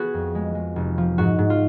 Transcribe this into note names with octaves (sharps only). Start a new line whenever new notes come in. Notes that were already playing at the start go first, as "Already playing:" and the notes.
Already playing: B3 F#4 G#4
F2
G#3
G#3
F1
F3
G#2 F#4
G#2
F4